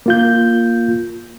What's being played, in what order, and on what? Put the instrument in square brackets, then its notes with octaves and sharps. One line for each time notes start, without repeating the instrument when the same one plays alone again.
[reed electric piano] A#3 F4 G6